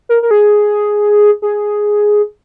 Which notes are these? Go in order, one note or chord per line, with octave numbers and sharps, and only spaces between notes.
A#4
A#4
G#4
G#4